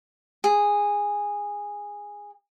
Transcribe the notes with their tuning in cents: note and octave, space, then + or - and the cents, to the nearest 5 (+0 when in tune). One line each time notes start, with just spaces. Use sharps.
G#4 -15